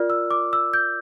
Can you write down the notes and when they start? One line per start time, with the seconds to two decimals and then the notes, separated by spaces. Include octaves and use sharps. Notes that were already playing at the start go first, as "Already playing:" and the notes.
Already playing: F4 A#4 D5 F6
0.10 E6
0.31 D6
0.53 E6
0.74 G6